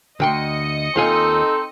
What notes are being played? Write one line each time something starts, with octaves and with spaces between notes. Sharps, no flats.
D2 D#5 G5 C6 D#6 C#7
D#2 C4 D#4 F4 A4 G#5